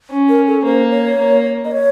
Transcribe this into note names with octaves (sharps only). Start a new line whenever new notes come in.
C#4
A#4
A4
A#3 C5
C#5
A#3
D#5
C#5